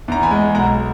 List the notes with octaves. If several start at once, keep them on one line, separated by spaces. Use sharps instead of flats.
E2 A#5
G#5 B5
G#3
B1 F#5 A#5